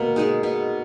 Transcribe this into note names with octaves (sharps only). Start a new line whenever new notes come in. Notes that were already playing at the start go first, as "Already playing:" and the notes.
Already playing: B2 A#3
G#3 D#4 G#4
B2